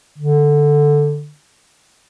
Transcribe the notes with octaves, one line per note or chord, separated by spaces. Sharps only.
D3